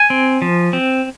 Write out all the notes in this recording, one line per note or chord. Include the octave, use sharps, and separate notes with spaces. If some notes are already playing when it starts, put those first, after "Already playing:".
Already playing: G#5
C4
F3
C4